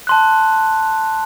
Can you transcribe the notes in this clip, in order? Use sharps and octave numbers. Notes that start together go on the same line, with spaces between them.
A5 C6 F#6